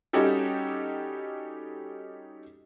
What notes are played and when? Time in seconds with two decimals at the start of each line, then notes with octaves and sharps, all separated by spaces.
0.13 G3 C#4 D#4 F#4 G4 A4